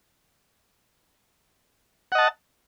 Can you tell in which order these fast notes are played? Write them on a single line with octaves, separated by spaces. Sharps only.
F#5 D#5 A5